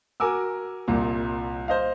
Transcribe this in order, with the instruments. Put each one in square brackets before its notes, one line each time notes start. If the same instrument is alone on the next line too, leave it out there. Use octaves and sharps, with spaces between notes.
[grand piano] F#4 A#4 G#5 D6 E6
C2 A#2
C5 D#5 F5